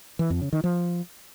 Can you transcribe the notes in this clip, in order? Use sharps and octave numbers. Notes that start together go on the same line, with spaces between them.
E3
F2
C#3
D#3
F3